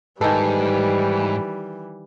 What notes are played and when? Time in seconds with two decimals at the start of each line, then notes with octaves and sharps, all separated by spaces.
0.21 G#2 D#3 E3 G3 A4 B4 D#5 G#5